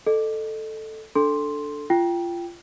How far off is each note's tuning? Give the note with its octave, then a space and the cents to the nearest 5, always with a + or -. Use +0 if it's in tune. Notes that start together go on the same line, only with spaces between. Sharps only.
A4 +0 D#5 -30
D4 +0 A4 +0 C6 +0
F4 -25 G5 +0